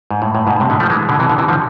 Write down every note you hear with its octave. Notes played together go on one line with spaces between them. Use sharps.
G#2
A2
A2
G#2 B2
A2 C3
B2 D3
F3 A3
E3 G#3
B2 D3
C3 E3
B2 D3
C3 E3
D3 F3